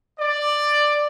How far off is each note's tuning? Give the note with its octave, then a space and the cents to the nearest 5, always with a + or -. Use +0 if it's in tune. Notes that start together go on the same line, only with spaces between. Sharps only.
D5 +10